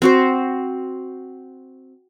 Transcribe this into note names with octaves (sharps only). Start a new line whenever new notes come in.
C4 F#4 C5